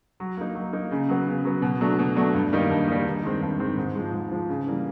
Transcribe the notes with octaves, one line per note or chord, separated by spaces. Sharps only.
F#3
A#3 D#4
F#3
A#3 D#4
C#3
F#3 B3
C#3
F#3 B3
B2
F#3 A3 D4
B2
F#3 A3 D4
G2
D#3 G3 A#3 D#4
G2
D#3 G3 A#3 D#4
G2
D#3 G#3 C4
G2
D#3 G#3 C4
G#2
F3 G#3
G#2
F3 G#3
C#3
E3 G3 A#3